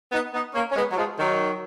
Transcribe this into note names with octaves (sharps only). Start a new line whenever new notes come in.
B3 D#4
B3 D#4
A#3 C#4
C#4
G#3 B3
F#3
F3 G#3
D#3 F#3